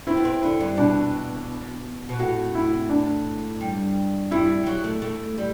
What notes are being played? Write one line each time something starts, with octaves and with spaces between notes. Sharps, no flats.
C4 E4
B3
C4
D3 E4
G2
B2 D4
B2
A2 F#4
E4
D4
G2
G2 E4
G3
F#3
A3
A3
G3